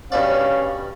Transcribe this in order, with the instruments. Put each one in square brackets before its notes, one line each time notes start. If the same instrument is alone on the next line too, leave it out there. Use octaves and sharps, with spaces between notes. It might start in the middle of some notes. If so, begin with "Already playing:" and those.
[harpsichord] G2 B2 D5 [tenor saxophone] C#4 [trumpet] F5